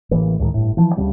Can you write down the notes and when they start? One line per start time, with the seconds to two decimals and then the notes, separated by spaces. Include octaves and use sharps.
0.11 A1 C#3 E3 A#3
0.39 C#2 A2 D3 D#3
0.54 G1 A2
0.77 E3 F3
0.96 D2 C#3 G3 D4